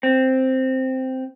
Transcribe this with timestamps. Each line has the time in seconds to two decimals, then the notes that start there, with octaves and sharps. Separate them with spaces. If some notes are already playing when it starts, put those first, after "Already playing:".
0.03 C4